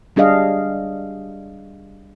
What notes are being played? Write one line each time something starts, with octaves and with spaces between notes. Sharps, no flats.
G3 D4 G#4 D#5 F5